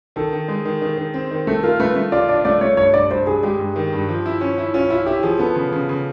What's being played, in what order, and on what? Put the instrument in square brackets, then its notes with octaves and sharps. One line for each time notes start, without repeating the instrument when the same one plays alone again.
[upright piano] D#3 [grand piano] A4
[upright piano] D#3
G#3
D#3
D#3
D#3
C4
D#3
[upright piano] A3 [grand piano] A4
[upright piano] F4 [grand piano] A#4
[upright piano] A3 [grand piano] B4
[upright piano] A3
[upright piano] F4 [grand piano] D5
[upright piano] D4 [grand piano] D5
[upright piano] A3 [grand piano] D5
[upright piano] A3 [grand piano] C#5
[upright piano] G2 [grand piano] C#5
[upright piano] G2 [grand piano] D5
[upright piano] G2 [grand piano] C5
[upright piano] G2 [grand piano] G#4
[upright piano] G#3 [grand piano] G4
[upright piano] G2
D#3
G2
F3
E4
C#4
E4
[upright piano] C#4 [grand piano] F4
[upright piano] E4 [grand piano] F4
[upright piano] E4 [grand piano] G4
[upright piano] F3 [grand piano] G#4
[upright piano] B3 [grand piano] A4
[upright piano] C#3
C#3
C#3